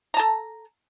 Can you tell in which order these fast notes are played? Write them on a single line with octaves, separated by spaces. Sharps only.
A#5 A5 A4